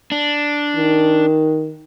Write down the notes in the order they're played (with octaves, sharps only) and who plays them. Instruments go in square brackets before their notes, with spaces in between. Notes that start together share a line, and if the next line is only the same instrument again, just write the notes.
[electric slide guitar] D4
[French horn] D#3